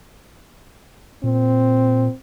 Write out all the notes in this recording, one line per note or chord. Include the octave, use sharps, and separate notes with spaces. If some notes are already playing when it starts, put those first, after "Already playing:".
A#2 C4